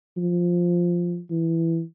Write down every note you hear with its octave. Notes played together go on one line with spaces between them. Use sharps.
F3
E3